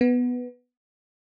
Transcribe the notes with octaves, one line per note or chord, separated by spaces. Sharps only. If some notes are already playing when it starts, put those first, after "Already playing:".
B3